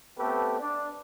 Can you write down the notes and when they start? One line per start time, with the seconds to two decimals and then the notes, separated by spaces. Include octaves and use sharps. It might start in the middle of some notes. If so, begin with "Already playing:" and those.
0.19 A3 B3 C4 G4 A4 B4
0.60 D4